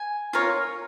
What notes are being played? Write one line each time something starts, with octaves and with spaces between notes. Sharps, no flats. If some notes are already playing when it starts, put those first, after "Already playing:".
Already playing: G#5
F4 A#4 C#5